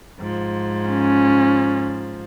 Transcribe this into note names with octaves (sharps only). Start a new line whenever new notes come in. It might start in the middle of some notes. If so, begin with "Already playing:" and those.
G#2 F3
C#4